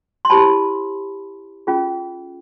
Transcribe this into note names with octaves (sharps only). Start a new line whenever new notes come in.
C6
E4 G4 C5 A5 B5
C#4 F4 G#4